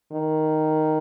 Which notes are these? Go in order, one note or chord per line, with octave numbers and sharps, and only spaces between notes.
D#3